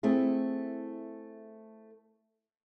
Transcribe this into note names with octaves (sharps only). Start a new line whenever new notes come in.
A3 C4 E4 G#4